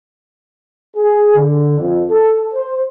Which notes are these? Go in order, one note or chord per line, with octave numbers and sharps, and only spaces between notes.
G#4
D3
F2
A4
C5